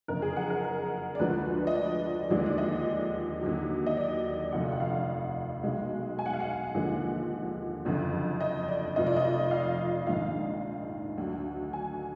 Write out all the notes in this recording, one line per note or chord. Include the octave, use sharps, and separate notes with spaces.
F#1 F2 D3 A#4
G#4
F#5
A#4
A#4
D5
D2 D3 F3 G#3 B4
D#5
D5
D#2 D3 F3 G#3 D5
D5
D#5
D#2 D3 F#3
D#5
D5
F1 F2 D3 F#5
F#5
F5
B1 B2 G#3
G#5
F#5
F5
F#5
D#2 D3 F3 G#3
F#1 F2 D3
D#5
D5
F1 F2 F3 D#5
D5
D#5
F5
A#1 G#2 D#3 F5
D2 D3 F#3
G#5